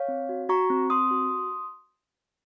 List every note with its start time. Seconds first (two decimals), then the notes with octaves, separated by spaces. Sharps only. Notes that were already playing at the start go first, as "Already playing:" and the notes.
Already playing: C#5 F5
0.08 C4
0.29 F#4
0.49 F#4 A#5 C#6
0.70 C4
0.90 C4 C6 D#6
1.11 F#4